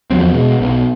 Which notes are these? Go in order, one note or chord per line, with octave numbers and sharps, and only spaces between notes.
E2 F3 F#3 C4
B2 G#3
B1